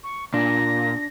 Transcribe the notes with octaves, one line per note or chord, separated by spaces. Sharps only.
C#6
A#2 D4 A#6